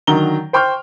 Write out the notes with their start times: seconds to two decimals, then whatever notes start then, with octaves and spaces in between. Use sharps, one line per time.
0.07 D3 D#3 F#3 A#5 G7
0.53 C5 G5 C6 C#6 F6 G6